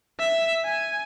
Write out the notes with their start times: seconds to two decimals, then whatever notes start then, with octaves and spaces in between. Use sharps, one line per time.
0.19 E5
0.65 G#5